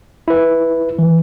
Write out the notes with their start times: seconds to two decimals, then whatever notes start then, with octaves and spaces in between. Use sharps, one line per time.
0.28 E4 B4
0.99 E3